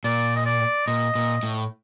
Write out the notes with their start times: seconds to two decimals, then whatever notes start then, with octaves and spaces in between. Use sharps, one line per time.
0.04 A#2 D5
0.36 D#5
0.46 D5
0.87 A#2 D#5
1.15 A#2
1.43 A2